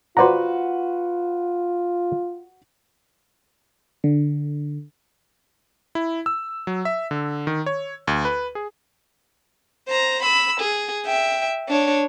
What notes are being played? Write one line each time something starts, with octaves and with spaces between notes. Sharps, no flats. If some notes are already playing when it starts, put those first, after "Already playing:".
F4 F#4 B4 C5 D5 F#5 A#5
D3
E4
E6
F#3
E5
D3
D#3
C#5
D2
B4
G#4
C5 A#5
B5 E6
G#4
E5 G5
D4 C#5